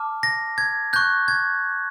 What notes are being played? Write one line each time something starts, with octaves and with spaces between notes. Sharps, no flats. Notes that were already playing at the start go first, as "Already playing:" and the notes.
Already playing: A5 D6 F6
A#6
G#6
C#6 F#6 G6
G#6